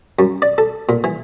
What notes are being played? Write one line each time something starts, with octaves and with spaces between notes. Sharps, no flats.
F#2
D5
A4
A#2
E3